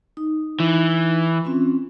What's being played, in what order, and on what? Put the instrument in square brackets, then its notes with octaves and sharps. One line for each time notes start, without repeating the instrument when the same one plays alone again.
[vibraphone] D#4
[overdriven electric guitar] E3
[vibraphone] C4 C#4 F4